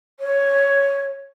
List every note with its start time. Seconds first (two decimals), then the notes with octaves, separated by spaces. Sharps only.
0.19 C#5